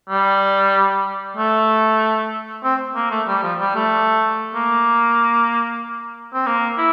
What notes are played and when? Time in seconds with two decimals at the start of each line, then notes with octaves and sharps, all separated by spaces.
0.09 G3
1.37 A3
2.63 C4
2.95 A#3
3.11 A3
3.27 G3
3.43 F3
3.60 G3
3.75 A3
4.55 A#3
6.34 C4
6.46 A#3
6.78 E4